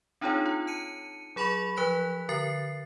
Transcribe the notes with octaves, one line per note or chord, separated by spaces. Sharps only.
C4 D4 D#4 F4 G#4 C#5
F4
A5 C#7 D#7
F#3 G#4 B5 C#6 F7
F3 B4 F#6 B6
D3 A#4 A6 C7